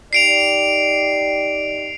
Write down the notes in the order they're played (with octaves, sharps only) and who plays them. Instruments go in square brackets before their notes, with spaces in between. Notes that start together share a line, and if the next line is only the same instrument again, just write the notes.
[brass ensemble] D#4 G4 D5 [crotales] C7 D7 F7